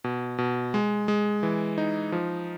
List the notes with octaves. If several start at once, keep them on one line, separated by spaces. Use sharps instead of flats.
B2
B2
G#3
G#3
E3
D#4
F3